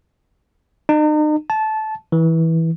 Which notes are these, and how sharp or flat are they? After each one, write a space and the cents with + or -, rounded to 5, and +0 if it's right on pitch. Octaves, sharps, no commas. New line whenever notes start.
D#4 -40
A5 -15
E3 -15